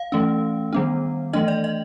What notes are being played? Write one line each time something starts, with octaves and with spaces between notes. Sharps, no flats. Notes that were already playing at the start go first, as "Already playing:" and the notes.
Already playing: F5
E3 A3 C#4
D#3 G3 B3 D4
E3 A3 D4 D#5
D5
D#5